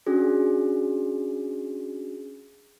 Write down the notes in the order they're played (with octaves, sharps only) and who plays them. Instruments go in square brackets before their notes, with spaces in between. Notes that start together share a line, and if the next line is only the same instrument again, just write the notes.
[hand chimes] C#4 D4 F#4 G#4